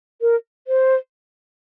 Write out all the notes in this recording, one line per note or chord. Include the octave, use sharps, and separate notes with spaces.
A#4
C5